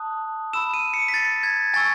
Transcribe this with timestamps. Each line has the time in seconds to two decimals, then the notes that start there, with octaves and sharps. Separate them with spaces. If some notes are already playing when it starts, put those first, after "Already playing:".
Already playing: A5 D#6 F#6
0.53 B5 E6 E7
0.74 D#7
0.94 C#7
1.08 B6
1.14 A6
1.43 G#6
1.74 G#5 C#6 E6 A6